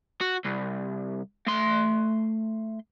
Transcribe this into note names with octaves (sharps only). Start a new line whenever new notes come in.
F#4
C2
A3 C6